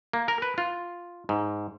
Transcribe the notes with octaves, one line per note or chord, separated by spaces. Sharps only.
A#3
A#4
B4
F4
G#2